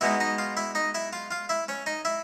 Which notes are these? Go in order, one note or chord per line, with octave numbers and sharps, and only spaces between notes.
B2 G#3 B3 D#4 E4 E5
D#4 D#5
F4 F5
E4 E5
D#4 D#5
E4 E5
F4 F5
F4 F5
E4 E5
C#4 C#5
D#4 D#5
E4 E5